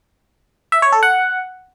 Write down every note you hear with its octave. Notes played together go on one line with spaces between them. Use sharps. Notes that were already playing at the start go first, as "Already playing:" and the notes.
E5
C#5
A4
F#5